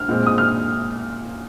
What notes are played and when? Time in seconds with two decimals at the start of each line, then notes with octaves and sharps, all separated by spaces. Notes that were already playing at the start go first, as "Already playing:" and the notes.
Already playing: F6
0.09 A#2 G#3 C4
0.26 D#6
0.38 F6